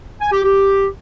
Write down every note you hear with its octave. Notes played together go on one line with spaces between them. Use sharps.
G#5
G4
G4